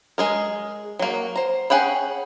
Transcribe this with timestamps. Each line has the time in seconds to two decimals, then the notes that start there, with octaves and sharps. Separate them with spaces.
0.18 G#3 G#4 A#4
0.99 F#3 A#3
1.36 C5 A#5
1.70 C#4 G#4 F#5 G5 B5